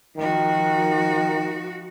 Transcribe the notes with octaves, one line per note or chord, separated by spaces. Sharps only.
D#3 F3 F#4